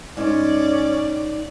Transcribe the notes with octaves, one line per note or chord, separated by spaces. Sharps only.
G#2 C#4 D5